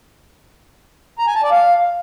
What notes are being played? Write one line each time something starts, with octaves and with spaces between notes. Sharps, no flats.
A#5
G#5
A5
D5
F5